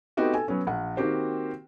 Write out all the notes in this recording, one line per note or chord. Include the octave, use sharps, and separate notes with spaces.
A3 B3 C4 D#4 F#4 G4
A4 G#5
F#3 B3 C#4
A#1 F#5
D#3 A#3 C4 F#4 G4 C5